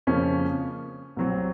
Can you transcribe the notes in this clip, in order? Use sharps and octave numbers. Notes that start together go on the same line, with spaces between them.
F2 C#3 F3 A#3 C#4
C2 C3 F#3 C4 F#4